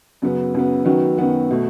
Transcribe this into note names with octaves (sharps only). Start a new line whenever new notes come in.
F#2 C#3 F#3 B3
F#2 C#3 F#3 B3
F#2 D#3 F#3 B3 F#4
F#2 D#3 F#3 B3 F#4
B2 A3